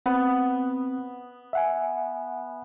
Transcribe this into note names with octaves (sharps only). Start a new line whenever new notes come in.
B3 C4
E5 F#5 G#5